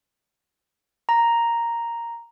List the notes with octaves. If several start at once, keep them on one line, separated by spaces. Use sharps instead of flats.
A#5